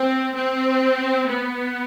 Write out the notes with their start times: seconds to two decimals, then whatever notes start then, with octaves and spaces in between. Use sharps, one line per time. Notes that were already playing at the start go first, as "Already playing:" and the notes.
Already playing: C4
0.35 C4
1.28 B3